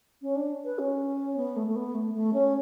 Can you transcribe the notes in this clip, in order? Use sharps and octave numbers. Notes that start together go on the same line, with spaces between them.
C#4
D4
B4
C#4
B3
A3
A3
B3
A3
A3
C#4